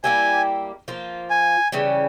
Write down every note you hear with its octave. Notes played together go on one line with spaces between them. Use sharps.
G3 A#3 E4 G4 G#5
F3 A#3 F4
G#5
C#3 E3 G3 C#4